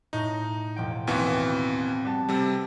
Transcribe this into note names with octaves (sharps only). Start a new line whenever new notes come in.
A2 D#4 A#6
E1 F3 G5
D#2 E3 F3 B3 C4 F#4
G3 B3 A5
C3 G3 A4 E6 A6